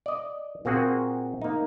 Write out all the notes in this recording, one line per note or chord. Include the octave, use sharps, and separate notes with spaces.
D5 D#5
A#2 A#3 C4 F#4 G#4 F#5
A#3 D#4